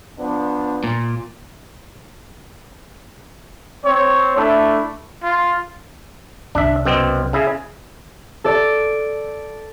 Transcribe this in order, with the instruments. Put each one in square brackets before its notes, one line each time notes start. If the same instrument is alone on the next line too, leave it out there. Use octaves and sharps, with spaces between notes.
[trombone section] F3 B3 D4
[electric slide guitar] A#2
[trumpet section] C4 C#5
A3 D4 E4
[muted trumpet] F4
[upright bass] C2 C3 [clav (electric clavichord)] D4 E5
[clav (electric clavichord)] F#2 B2 C4
C#3 E4 G#4
[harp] A4 D5